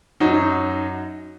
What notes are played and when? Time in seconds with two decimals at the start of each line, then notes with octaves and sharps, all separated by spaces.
0.20 F#2 F#3 D#4 F#4